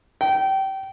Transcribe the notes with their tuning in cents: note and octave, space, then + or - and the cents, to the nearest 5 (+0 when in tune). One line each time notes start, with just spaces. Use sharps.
G5 -25